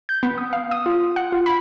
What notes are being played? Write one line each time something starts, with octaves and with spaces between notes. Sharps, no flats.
G6
B3
D#6
F5
D#6
F4
F#5
F4
B5